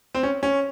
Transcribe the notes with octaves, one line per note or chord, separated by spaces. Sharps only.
C4
C#4
C#4